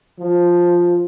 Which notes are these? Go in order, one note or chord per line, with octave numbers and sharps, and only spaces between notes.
F3